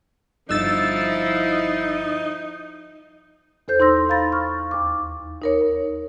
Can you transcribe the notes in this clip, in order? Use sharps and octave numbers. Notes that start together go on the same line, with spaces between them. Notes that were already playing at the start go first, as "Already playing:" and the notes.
G1 F3 D#4 E4 E6 A6
E2 A4 C5 G6
D#4 C6 E6 A#6
F5 A#5 B5 A6
C#6 F6
D#2 D6
D#4 A#4 C#5